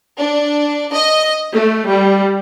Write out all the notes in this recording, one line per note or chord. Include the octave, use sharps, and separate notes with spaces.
D4
D#5
A3
G3